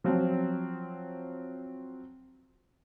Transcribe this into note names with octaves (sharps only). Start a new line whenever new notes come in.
F3 F#3 C4